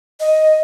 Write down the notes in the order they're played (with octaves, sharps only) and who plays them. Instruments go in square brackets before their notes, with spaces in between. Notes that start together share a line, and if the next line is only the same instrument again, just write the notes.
[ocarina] D#5